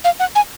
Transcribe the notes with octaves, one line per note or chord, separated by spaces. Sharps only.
F5
F#5
G#5